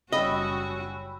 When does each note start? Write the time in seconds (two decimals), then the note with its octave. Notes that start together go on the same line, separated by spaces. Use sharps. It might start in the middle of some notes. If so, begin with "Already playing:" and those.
0.12 F#1 G3 C#4 F#4 D#5 G5 B5 E6